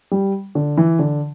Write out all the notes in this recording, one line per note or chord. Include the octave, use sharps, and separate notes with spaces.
G3
D3
E3
D3